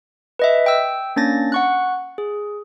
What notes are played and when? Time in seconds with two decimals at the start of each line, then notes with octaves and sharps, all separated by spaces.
0.39 B4 D#5 E5
0.66 G5 E6
1.16 A#3 C#4 D4 A6 A#6
1.52 F#5 C#6 F#6
2.18 G#4